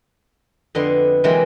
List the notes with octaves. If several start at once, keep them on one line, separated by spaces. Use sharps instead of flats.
F2 D3 B3 D#5 C6
C3 E3 F#3 G#3 A#3 C4